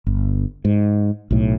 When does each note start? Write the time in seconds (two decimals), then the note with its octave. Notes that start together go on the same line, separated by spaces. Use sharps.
0.07 G1
0.65 G#2
1.31 B1 A2